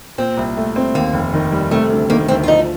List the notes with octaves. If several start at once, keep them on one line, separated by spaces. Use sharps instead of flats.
A#2 C4
C2
A3
C4
D#2 A#3
F1
D#3
G3
C3 A3
D2
D#3 A#3
D2 C4
F4
F3 D#4